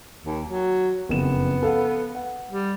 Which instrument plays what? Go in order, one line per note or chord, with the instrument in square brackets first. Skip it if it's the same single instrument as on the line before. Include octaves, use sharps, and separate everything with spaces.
[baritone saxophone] D#2
F#3
[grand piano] F#1 F2 E7 [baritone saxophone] B3
[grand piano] A4 F5 F#5
F#5
[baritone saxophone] G3